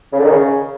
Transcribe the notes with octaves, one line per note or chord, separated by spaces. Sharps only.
C#3
D3
D#3
C#3